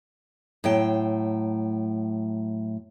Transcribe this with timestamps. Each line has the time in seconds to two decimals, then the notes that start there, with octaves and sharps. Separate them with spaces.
0.64 A2 F#3 G5